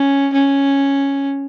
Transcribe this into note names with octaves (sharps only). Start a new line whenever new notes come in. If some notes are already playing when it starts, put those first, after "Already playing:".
Already playing: C#4
C#4